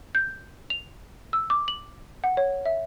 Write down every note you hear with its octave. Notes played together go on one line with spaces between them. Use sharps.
G6
F7
E6
D6
F#7
F#5
C#5
E5